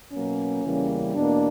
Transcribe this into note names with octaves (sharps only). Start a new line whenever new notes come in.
B2 F#3 A#3 C#4
E2 C#3 E3 G3 A#3
E2 B2 A#3 D4